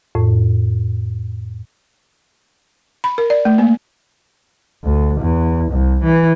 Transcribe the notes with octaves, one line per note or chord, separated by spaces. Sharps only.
F2 A2
B5
A#4
D5
A3
A#3
D2
E2
C2
E3